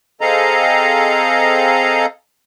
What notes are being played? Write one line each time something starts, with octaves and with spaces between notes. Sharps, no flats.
C4 G#4 A4 D#5 F5 A#5